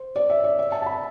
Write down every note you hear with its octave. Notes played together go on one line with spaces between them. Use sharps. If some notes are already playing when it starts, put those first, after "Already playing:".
Already playing: C5
D5
E5
D5
E5
A5
A5
B5